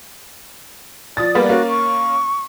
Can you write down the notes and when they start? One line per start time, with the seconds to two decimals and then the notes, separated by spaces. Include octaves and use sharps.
1.17 F3 D5 D#6 A6
1.35 G3 A#3 B3
1.49 A#3 C#4 F#4
1.69 C#6